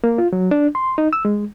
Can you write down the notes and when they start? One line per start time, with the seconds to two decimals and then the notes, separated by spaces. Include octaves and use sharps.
0.04 A#3
0.18 F4
0.33 F#3
0.51 D4
0.75 C6
0.98 D#4
1.13 E6
1.25 G#3